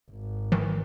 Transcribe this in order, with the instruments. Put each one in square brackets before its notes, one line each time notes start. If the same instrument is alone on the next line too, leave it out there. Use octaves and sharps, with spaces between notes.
[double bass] G#1
[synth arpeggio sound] D#3 E3